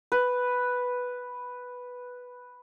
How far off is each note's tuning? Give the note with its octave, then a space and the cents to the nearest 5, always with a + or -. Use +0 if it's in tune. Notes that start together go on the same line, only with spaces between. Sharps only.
B4 +0